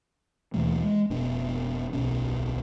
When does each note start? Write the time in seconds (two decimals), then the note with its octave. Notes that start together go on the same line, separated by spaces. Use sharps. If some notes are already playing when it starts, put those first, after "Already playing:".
0.54 D#2 B2 E3 A3
0.81 G#3
1.10 F1 B2 D4
1.93 D1 B1 B2 C#4